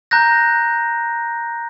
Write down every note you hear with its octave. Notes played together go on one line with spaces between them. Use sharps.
A#5 F#6 G6 A#6